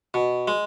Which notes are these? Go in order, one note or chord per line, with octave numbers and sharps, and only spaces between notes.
B2
G#3